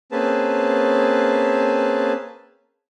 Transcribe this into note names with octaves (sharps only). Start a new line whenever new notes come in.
A#3 C4 C#4 G#4 B4 A5